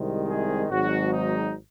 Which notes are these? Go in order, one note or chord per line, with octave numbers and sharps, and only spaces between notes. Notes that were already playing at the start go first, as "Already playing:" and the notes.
Already playing: C2 C3 D#3 G#3
G#4
G#1 G#2 F#3 F#4
D#4